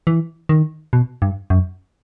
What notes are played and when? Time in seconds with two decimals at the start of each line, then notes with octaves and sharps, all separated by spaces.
0.07 E3
0.49 D#3
0.93 B2
1.22 G2
1.50 F#2